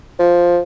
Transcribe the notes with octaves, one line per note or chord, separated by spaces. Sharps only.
F3